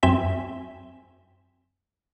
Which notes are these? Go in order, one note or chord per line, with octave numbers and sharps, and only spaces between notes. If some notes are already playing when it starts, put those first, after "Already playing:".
F#2 C4 E5 G5 G#5 B6